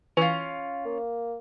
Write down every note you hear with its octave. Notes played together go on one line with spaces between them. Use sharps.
E3 C#4 F4
A#3